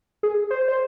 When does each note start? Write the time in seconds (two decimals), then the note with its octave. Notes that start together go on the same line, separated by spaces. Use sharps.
0.23 G#4
0.50 C5
0.68 C5